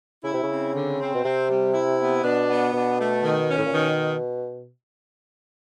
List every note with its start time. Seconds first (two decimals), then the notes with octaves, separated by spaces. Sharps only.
0.24 C#3 E4
0.33 C3
0.43 C#3
0.49 C4
0.74 D3
1.00 C4
1.15 B2
1.24 C3 C4
1.49 G3
1.74 E4
1.99 B3
2.24 B2 D4
2.48 B3
2.74 B2 D4
2.99 A3
3.23 D#3
3.49 C#4
3.58 A2
3.66 A#2
3.73 B2 D#3